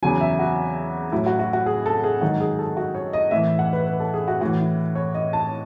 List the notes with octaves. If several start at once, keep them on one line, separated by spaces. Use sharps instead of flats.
E2 C#3 F#3 G#5
E5
F#4
A2 F#3 E4
F#4
F#4
F#4
G#4
A4
G#4
G#2 D#3 F#3 F#4
G#4
A4
F#4
C#5
D#5
A2 E3 E5
F#5
B4
B4
A4
G#4
F#4
A2 E3 F#4
E4
C#5
D#5
A5